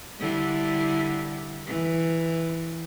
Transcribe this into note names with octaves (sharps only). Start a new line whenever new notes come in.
D3 G3 E4
E3